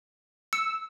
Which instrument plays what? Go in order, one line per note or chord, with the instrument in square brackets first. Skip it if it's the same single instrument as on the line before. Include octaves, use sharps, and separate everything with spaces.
[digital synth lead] E6 [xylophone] C#7